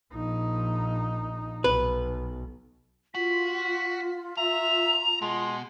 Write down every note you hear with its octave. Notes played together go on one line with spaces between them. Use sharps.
A#1 D#4
B1 B4
F4 F#4 B6
E5 A#5 F7
B2 G#3 C6